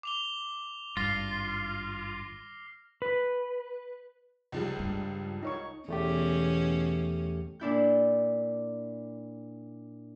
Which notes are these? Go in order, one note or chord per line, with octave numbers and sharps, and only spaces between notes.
D6 F7 G7
G#1 G2 F4 F6 A#6 C7
B4
C#2 F3 G3
G2
D#4 C#5 C#6
E2 B2 E3 A3 C#4 G4
A#2 D4 E4 G6